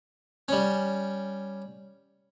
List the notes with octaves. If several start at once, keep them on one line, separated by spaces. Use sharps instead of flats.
G3 C#4